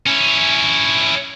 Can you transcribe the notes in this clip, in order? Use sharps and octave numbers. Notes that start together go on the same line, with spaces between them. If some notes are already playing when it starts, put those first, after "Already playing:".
C#4 E4